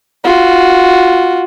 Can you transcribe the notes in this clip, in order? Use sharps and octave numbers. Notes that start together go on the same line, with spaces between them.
F4 F#4